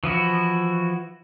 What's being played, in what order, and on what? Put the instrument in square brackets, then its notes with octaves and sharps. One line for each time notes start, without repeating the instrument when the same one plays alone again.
[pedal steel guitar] E3 F3 E4 F#4